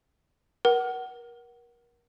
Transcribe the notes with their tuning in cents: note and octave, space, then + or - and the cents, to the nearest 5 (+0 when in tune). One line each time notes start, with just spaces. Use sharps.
A#4 +35 F#5 +20